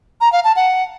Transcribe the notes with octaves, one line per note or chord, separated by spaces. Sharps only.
A#5
F5
A5
F#5